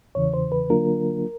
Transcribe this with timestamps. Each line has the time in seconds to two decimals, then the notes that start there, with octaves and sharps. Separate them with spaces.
0.15 E2 C#3 E3 C#5
0.34 C5
0.52 B4
0.70 D3 F#3 A#3 D4 F4 A#4